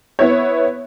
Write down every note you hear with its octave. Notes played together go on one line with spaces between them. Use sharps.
B3 E4 C#5